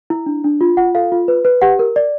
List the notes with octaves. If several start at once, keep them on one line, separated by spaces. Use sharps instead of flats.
E4
D4
D4
F4
F4 F#5
A4 F5
F4
B4
B4
G4 F#5
A#4
D5